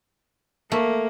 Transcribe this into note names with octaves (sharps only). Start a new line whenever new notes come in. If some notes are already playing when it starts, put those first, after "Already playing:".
A3 A#3